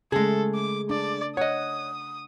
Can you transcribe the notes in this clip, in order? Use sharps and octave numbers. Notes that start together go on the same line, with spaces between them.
C#3 G#3 A3 G#4 A4
D6
D4 D5
C#5 D#5 F#5 D#6